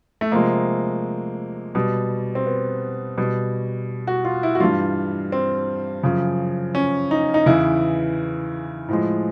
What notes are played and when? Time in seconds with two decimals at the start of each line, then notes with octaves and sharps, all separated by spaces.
0.21 A3
0.32 C3 F3 G#3 A#3
1.75 B2 G3
2.35 C4
2.46 B3
3.18 B2 G3
4.07 F#4
4.25 F4
4.43 E4
4.55 F#4
4.60 G2 E3 G3 F4
5.32 C4
6.03 F#2 C#3 F3
6.75 C#4
7.11 D#4
7.34 D#4
7.46 E2 C#3 E3 E4
8.89 A2 F3 G#3